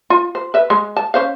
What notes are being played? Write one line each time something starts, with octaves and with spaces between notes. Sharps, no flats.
F4
C5
B4 E5
G#3
A5
C#4 C5 F5